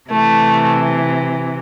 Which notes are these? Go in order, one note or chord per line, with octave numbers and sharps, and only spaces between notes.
C3 E3 A3